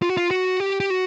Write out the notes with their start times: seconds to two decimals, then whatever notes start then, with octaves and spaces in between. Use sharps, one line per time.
0.02 F4
0.09 F#4
0.17 F4
0.31 F#4
0.60 G4
0.80 G4
0.90 F#4